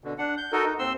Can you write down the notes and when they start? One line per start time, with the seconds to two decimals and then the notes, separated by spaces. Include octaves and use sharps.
0.04 B2 D3
0.18 D4 F#5
0.37 G6
0.52 D#4 F#4 A4 A#4 D#5
0.65 D#4
0.79 D#2 C4 C6 E6